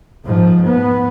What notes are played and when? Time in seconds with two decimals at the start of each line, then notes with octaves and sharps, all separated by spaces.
0.24 G#2 F3
0.66 B3